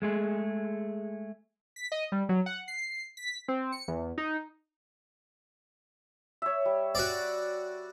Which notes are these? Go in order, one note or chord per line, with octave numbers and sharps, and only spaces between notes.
G#3 A3 G#4
B6
D#5
G3
F#3
F#5
C7
B6
C4
C#7
E2
D#4
C#5 E5
G3
F#4 C#5 D5